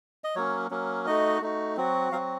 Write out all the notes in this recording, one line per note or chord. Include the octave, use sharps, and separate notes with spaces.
D#5
F#3 A#3 C#4 C#5
F#3 A#3 C#4
A3 D#4 F#4 D#5
A3 D#4 F#4
F#3 C4 F#4
F#3 C4 F#4 F5